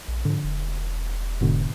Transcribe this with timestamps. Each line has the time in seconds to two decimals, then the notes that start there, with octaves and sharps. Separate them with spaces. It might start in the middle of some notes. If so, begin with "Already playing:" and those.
0.08 A#1
0.25 G#2 D3 F3
0.44 E1
1.41 G#2 B2 D3